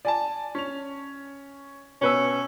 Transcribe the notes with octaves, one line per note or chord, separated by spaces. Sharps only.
D5 G#5 A5
C#4 F7
B2 C#4 B4 E6